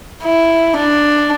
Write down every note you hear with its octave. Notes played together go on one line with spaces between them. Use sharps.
E4
D4